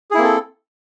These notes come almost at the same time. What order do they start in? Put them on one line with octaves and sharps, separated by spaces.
G#4 E4 A#3 C4 A4